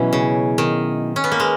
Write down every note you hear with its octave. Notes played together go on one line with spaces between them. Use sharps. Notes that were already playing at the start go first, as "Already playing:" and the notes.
Already playing: B2 E3 F#3 C#4 E4
C#3
D#3
C#4
B3
A#3
G#3